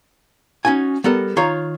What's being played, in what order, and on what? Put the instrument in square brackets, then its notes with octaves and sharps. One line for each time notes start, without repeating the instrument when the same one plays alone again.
[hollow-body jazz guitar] C#4 D#4 F#4 G#5
G3 B3 A4 A#4
D#3 F4 C#5 A#5